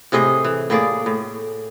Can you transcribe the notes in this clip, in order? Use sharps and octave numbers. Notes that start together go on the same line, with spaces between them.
A2 C3 G#4 D#5
E3
A2 A#3 G#4 D5
A2